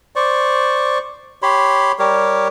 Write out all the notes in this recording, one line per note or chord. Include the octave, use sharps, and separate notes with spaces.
C5 D5 C#6
G4 C#5 B5 C6
G3 G4 A#4 C#5